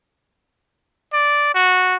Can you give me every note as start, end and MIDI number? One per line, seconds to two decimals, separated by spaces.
1.13 1.53 74
1.55 1.96 66